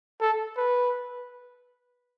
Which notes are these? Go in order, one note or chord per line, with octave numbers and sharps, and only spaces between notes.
A4
B4